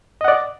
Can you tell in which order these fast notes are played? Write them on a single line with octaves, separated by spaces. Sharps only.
D#5 F#5 D5